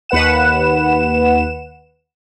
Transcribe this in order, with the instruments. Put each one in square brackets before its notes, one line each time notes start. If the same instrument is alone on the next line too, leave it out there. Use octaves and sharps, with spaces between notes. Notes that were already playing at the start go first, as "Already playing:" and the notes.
[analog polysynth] D#2 B4 F#5 E7